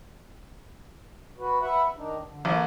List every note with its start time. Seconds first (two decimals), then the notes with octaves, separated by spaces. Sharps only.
1.38 F#4 B4
1.61 B4 E5 F#5
1.97 D#3 D4 D#4
2.27 D3
2.45 A1 D3 E3 A#3